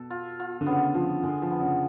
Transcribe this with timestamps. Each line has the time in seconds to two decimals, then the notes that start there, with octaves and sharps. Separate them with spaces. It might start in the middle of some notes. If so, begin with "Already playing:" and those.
Already playing: B2 A4
0.10 F4
0.40 F4
0.61 D3
0.66 C#3 B3
0.94 F3 F4
1.23 D3 G#3
1.42 F3
1.51 B3
1.60 C#3